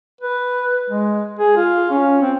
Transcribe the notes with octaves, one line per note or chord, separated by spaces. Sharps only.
B4
G#3
G#4
F4
C#4
C4